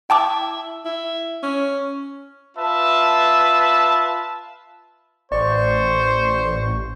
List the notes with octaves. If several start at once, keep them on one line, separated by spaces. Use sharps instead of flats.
E4 G5 A5 D6
E4
C#4
F4 B4 E5 A5
A1 C5 D5 C#6